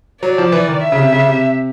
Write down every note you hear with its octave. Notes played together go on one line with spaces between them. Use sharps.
F#3 D5
F3
E3
D#3
E5
C#3
C3
C#3
C3